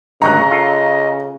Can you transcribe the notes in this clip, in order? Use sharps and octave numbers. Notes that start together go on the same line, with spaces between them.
G#1 D2 G2 C#3 D#5 A#5 C#6 F#6
F4 A4